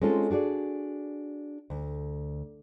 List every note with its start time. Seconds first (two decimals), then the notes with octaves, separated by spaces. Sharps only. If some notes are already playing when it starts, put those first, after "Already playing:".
0.02 G#3 C4 C#4 D#4 F4 A4
0.31 D4 F#4 G#4 D5
1.70 D2